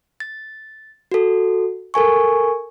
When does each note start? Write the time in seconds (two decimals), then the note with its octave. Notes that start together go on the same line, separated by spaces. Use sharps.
0.20 A6
1.12 F#4 A4
1.94 A4 A#4 G#5 C#6